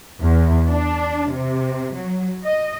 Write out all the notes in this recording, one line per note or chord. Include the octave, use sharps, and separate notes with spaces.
E2
D4
C3
F#3
D#5